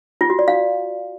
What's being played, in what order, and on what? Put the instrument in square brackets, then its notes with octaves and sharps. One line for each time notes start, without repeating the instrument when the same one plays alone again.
[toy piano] F4
F#4
D5
F5